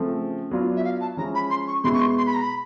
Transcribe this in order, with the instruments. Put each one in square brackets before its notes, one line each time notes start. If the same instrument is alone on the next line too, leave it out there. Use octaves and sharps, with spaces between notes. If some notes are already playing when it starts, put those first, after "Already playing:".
Already playing: [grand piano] C#3 F3 A3 C4
F#3 B3 D4 F4
[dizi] E5
F5
A5
[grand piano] F3 G#3 C#4 E4 [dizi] A#5
[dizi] B5
C6
C#6
[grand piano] B2 G#3 B3 E4 [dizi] C6
[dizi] C#6
C6
C6
B5
A#5
B5